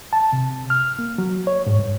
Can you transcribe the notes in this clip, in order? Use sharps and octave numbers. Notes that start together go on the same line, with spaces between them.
A5
C3
F6
A#3
F#3
C#5
G#2
G2